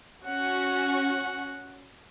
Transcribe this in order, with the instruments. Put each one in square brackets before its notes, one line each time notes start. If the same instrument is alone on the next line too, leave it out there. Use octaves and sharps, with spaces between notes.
[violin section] C#4 F#4 [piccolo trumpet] F#5